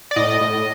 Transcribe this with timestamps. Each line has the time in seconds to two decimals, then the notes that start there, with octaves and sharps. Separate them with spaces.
0.11 D5
0.16 A2 D#5
0.41 A2